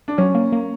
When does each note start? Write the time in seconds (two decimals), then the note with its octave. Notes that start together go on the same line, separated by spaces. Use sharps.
0.08 D4
0.18 F#3 C#4
0.35 A#3
0.52 A#3